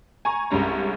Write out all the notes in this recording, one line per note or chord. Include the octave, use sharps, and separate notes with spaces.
G#5 A#5 C#6
C2 G2 G#3 C#4 A#5